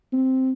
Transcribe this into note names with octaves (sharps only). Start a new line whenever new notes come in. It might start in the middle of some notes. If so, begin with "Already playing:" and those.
C4